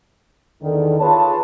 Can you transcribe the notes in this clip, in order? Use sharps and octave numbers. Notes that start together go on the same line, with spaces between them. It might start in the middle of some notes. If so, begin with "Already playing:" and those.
E2 D3 D#3
F4 G#4 B4 C#5 A5